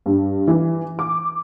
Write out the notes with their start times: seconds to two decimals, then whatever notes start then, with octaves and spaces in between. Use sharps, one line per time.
0.06 G2
0.48 E3
0.99 D6